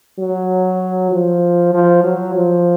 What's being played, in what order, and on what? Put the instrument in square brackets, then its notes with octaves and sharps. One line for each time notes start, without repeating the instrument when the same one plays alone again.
[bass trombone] F#3
F3
F3
F#3
F3